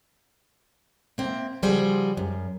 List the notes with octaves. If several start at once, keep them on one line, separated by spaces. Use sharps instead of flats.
A#3 C4 E5
C#3 F3 G3 F#4 G#4 C5
F#2